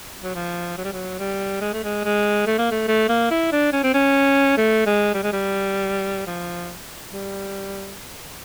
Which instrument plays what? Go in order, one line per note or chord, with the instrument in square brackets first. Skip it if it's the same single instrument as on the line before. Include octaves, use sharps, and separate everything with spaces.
[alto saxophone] F#3
F3
F#3
G3
F#3
G3
G#3
A3
G#3
G#3
A3
A#3
A3
A3
A#3
E4
D4
C#4
C4
C#4
A3
G#3
G3
G#3
G3
F3
G3